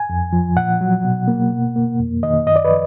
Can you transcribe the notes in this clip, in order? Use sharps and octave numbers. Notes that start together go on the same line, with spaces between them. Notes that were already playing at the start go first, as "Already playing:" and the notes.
Already playing: G#5
F2
F3
A#2 F#5
F#3
B2
A#3
B2
A#3
F2
D#3 D#5
F#2 D#5
D5
B4
F3